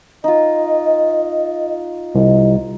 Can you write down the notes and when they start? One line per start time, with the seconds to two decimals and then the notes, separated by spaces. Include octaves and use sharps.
0.24 D#4 F4 D#5
2.15 C2 D#5